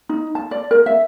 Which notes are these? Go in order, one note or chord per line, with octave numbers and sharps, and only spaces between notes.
D#4
A5
D5
A#4
E5